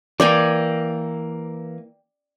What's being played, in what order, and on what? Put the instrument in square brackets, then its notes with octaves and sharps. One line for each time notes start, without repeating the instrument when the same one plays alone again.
[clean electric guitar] E3 A#3 [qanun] D5 G5 G#5